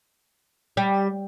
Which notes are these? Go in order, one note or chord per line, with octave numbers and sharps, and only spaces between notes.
G3